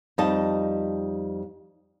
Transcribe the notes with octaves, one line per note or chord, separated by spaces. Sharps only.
F2 G3 D#4 D#5 A5